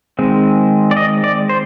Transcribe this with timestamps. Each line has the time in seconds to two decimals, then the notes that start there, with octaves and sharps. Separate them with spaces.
0.19 D#3 G#3 C4
0.91 D5
0.97 D#5
1.24 D5
1.49 C5